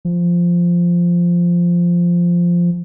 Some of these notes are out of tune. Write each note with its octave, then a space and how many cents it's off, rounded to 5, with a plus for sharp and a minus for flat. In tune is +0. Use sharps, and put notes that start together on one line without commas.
F3 -5